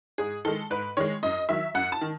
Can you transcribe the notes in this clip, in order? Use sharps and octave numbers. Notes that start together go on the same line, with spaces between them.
G#2 G#4
D#3 G#3 A4
G#2 B4
D#3 G#3 C#5
F#2 D#5
D#3 F#3 E5
F#2 F#5
A5
D#3